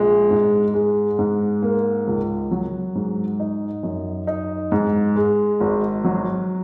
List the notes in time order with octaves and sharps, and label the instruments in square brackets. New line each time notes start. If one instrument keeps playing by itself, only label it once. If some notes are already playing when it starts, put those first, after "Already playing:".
Already playing: [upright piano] A#1 G#3
G#2
G#3
G#2
A#3
C#2
F#3
G#2
D#4
F#2
D#4
G#2
G#3
G#1
F#3